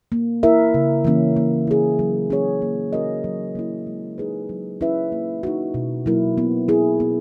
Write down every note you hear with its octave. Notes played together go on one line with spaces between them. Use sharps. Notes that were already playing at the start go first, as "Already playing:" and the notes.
A#3
E4 A#4 E5
C#3
E3 A#3 C#4
A#3
E4 G#4
F#3
C#4 G#4 C#5
A#3
C#4 F#4 A#4 D#5
F#3
A#3 C#4 E4
G#3
D#4 G#4 B4
F#3
C#4 E4 B4 E5
A#3
D#4 F#4
B2
F#3 A#3 E4 A#4
B3
E4 G#4
B3